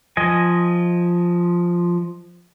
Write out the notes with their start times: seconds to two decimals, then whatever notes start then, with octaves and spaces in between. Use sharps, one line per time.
0.17 F3 D#5 G#5